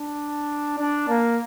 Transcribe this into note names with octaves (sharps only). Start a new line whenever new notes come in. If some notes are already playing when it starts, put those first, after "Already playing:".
Already playing: D4
D4
A#3